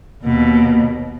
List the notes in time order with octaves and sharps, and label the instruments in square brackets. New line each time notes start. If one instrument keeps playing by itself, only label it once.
[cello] D#2 B2